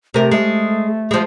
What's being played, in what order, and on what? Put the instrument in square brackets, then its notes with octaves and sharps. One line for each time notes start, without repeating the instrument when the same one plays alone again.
[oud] C3 A#4 [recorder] A3
[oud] G#3
F3 G#3